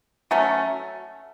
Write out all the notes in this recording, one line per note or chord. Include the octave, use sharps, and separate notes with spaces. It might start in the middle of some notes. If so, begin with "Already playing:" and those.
F#3 A3 C#4